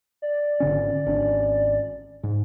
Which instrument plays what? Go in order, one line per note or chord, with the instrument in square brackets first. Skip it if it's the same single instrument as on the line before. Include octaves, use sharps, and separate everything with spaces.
[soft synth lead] D5
[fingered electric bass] G#1 D3 C#4
G#1 C#4 D4
G#2